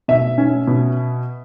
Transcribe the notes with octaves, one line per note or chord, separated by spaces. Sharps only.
B2 E5
C#4
B2